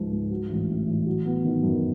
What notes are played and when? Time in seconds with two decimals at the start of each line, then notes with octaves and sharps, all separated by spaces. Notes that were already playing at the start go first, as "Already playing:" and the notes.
Already playing: C#2 G#2 F3 G#3
0.12 G#2
0.31 F#3
0.49 A1
0.69 A2
0.87 A1
1.06 F#3
1.25 B3
1.44 D#3
1.63 F#2